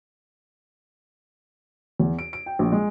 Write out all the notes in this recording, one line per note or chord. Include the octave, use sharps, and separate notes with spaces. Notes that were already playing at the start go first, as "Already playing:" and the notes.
E2
D7
D7
G5
A#1
G#3